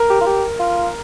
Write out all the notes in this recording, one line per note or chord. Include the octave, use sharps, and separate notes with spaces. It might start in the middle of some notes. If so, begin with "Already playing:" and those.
Already playing: A#4
G4
F4
G4
F4